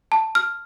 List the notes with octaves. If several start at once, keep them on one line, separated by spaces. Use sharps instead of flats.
A5
F6